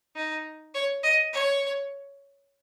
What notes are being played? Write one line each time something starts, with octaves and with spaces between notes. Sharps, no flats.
D#4
C#5
D#5
C#5